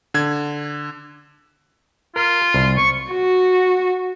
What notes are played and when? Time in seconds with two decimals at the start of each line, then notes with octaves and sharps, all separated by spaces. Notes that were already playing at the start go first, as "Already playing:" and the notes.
0.14 D3 G#6
2.16 F4 A#4
2.54 C2
2.77 C#6
3.12 F#4